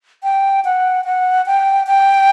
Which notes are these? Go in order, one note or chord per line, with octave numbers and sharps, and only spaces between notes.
G5
F#5
F#5
G5
G5